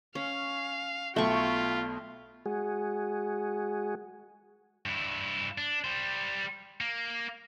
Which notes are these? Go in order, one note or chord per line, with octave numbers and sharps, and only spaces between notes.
C#4 F5
B1 B2 A3 F4 G5 B5 C#6
G#3 F#4 G#4
G2 E4
D4
G3 C5
A#3